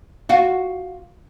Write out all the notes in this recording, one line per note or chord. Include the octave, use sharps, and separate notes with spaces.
F4 F#4